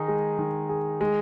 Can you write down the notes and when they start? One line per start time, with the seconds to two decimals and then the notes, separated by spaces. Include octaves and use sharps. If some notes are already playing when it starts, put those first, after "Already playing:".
Already playing: D#3 D#4 G#4
0.08 G#3
0.39 D#3
0.69 G#4
1.01 G#3